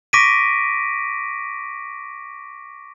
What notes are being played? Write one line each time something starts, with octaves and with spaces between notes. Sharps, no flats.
C#6 D6 A#6 B6 D7 D#7